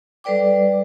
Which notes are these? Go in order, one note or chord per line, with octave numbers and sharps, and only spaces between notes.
G3 A4 B4 D5 G5 D6